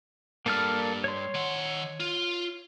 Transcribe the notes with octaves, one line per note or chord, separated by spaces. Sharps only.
G2 A#3 A4 F6
C#5 C6
D#3 F#5
F4